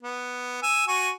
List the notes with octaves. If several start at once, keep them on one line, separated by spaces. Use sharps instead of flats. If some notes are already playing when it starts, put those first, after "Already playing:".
B3
G#5 E6
F#4 G#5 C#6